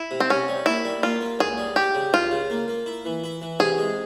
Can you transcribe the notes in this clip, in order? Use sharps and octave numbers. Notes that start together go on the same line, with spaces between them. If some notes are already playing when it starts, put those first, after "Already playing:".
Already playing: E4
C3
C4
C3 C#4
G3
A#3 E4
G3
A#3 F4
A#3
C#2 G#4
G3
G3 G4
C#3
C#2 F4
C#3
A#3
A#3
E4
E3
E4
E3
C3 G#4
G#3